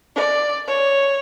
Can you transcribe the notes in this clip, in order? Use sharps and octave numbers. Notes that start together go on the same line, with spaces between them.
D5
C#5